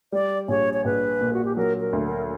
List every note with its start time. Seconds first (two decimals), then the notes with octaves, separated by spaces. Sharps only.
0.12 G3 D5
0.48 A#1 C#5
0.74 C#5
0.85 A#1 B4
1.21 A#2
1.34 F#4
1.45 G4
1.56 F#3 A#4
1.80 A#4
1.93 D2
2.05 A#4